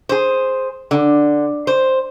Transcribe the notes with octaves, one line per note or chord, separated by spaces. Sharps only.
G#4 C5
D3
C5